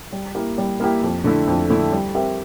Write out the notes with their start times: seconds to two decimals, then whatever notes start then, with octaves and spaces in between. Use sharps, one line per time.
0.13 G3
0.35 A#3 E4 G4
0.58 G3
0.80 A#3 E4 G4
1.03 F2
1.24 D3 A3 E4
1.48 F2
1.70 D3 A3 E4
1.92 G3
2.15 C4 G4 A#4 E5